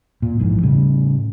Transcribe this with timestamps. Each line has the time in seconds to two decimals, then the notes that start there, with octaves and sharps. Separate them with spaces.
0.22 A#2
0.39 A#1 G#2 E3
0.63 A2 C#3 G3